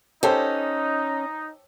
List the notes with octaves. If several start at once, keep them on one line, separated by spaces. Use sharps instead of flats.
C#4 D#4 G4 A4 C5